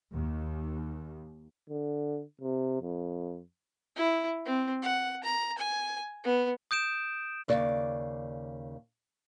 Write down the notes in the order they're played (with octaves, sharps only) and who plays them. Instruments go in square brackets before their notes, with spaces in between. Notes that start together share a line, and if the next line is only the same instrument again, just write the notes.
[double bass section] D#2
[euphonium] D3
C3
F2
[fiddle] E4
C4
F#5
A#5
G#5
B3
[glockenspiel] D#6 G6 D7 E7
[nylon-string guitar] D#2 C#3 D5